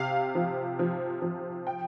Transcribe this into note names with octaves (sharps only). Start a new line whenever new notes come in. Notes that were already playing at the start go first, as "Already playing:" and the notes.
Already playing: C3 F5
F3
F3
F3
G5